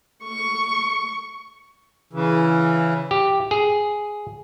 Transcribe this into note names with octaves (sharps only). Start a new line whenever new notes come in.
C#6
C#3 E3
G4
G#4